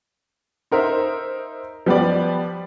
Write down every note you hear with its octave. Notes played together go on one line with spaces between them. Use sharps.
D#4 A#4 C5 E5
F3 G3 B3 G4 B4 D5